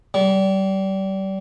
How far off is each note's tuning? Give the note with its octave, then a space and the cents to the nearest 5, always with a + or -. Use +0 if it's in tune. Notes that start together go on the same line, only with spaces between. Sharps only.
G3 -30